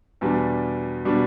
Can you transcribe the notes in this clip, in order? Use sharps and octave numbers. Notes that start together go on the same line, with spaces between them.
E2 B2 G3 D4
B2 G3 D4